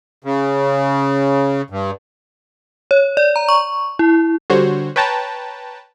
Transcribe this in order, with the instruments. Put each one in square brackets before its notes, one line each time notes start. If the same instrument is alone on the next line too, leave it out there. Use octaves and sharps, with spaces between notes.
[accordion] C#3
G2
[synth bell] C#5
D5
A#5
C#6
E4
[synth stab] D3 G3 F#4 C5 C#5
B4 C#5 G5 A5 A#5